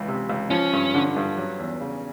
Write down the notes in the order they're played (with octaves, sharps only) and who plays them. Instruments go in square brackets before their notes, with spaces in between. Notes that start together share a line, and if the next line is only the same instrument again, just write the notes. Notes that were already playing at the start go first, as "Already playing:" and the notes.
Already playing: [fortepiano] C#2 E3
C3
C#2
[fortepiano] F3 [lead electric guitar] C#4
[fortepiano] G2
D3
G2
F#3
E2
C#3